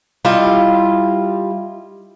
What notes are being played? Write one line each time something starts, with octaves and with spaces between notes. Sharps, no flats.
G3 E4 F4 D#5